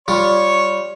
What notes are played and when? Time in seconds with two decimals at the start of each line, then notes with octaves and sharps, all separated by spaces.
0.08 G3 F4 C#5 C#6